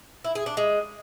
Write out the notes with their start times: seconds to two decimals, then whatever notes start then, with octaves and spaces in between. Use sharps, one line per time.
0.24 E4
0.35 G#4
0.46 D4
0.57 G#3